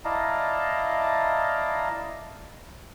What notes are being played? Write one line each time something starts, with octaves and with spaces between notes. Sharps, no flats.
E4 D5 D#5 F5 A5 A#5